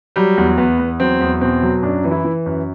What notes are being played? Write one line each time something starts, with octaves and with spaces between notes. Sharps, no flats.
F#3 G3
E2
E2 B3
E2
F#3 C4
E2
B2 C4
F#3
F#2 D4
E3
E4
E3
F#2